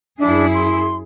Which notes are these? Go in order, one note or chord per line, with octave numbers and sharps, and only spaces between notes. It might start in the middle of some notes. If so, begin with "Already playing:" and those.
F#2 D4 E4 G#4
C6